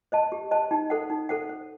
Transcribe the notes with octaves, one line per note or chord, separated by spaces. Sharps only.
C5 D#5 A5
G4
C5 D#5 A5
D#4
A4 C5 F#5
D#4
A4 C5 F#5
C5